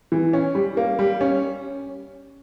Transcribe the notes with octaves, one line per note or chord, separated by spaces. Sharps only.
E3
C#4
G3
A#3
G3
C#4